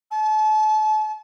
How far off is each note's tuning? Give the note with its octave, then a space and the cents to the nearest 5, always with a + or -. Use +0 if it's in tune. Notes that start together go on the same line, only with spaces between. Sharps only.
A5 -35